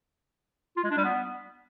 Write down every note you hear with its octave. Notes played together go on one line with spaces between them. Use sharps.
F4
G#3
D4
G3
B3